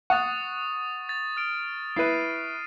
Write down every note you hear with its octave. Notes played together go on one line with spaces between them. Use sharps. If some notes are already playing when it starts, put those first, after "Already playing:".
F#5 C#6 D#6 A6
A6
F6 D7
E4 B4 C7 D#7